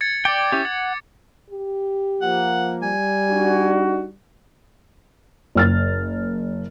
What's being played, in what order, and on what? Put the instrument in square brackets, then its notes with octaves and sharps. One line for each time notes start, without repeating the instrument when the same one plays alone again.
[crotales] G#6 A6 C#7
[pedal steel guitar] D5 G5 [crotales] D6 A6
[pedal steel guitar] C#4 E4 G4
[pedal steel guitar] F#5 [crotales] G#6
[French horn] G4
[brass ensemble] F3 A#3 [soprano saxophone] F#5
[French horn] G3 [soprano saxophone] G#5
[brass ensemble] D4 D#4 F#4
[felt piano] F#1 F6 A6